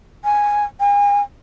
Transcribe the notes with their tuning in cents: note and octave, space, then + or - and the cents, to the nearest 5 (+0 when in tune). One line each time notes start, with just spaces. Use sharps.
G#5 -5
G#5 -40